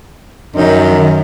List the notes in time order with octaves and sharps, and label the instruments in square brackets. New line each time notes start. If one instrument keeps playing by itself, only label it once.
[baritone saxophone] F#2 [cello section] D#3